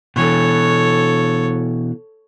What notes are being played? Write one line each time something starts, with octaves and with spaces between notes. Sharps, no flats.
B2 E3 A4 C#5